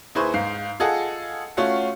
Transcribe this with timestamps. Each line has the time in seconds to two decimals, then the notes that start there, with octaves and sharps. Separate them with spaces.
0.15 D#2 E4 G#4 B4 C5 C#6
0.34 G#2 F5 C7
0.80 F4 G#4 A4 D#5 F#5
1.57 A3 C#4 F4 F#4 F5 F#5